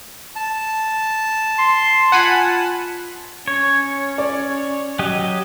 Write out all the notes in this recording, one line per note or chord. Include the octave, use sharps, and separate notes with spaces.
A5
C6
F4 F#5 G#5 B5
C#4 C#5
D5
F#3 G4 D#5